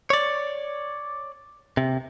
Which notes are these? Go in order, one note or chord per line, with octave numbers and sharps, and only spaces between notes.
C#5 D5
C3